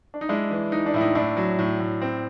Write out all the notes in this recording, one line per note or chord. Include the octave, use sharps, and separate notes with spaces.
D4
D#4
G#3 D4 E4
E3
E3 D#4
D4
A2 E4
D#4
A2 D4 E4
F#3
A2
A2
C4